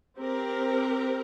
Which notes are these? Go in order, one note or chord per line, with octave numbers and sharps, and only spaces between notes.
C4 G4 A#4